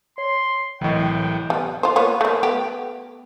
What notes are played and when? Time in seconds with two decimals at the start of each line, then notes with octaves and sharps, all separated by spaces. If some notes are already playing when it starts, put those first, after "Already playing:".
0.18 C#5 C6
0.81 C2 A2 E3 F#3 D#5 G5
1.50 G3 B3
1.83 F4 C5
1.96 A#3 B3 C#5
2.21 A3 A#3
2.43 A3 B3 G4